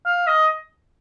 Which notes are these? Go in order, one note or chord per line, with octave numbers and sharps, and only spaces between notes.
F5
D#5